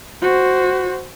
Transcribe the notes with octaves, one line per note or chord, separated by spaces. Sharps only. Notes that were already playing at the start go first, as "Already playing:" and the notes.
F#4 C5